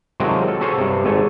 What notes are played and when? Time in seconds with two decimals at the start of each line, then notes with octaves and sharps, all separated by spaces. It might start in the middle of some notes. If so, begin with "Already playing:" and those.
0.20 C3 D#3 F3 F#3 G#3 C4
0.48 A4
0.61 C#4 F#4 G#4 A4 C5 C#5
0.78 G2 C3
1.04 G#1 G#2 A4 C#5 G#5